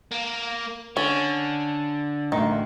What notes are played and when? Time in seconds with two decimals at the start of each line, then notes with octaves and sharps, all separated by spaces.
0.11 A#3
0.97 D3 C#4
2.32 A1 D2 D#3